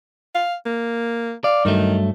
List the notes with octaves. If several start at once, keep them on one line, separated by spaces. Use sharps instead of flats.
F5
A#3
D5 F5
G2 D#3 F#3 A3